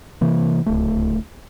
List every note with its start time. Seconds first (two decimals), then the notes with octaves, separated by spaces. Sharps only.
0.21 C3 E3 A#3
0.66 D1 C#2 A3